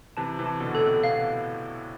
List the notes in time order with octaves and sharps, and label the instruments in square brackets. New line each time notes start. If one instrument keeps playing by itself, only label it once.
[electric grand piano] C3 E3 [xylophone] A5
[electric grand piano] C3 E3
[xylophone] A5
[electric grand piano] B2 D3
[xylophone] A4
[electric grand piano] A2 C3
[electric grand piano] B2 [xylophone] F5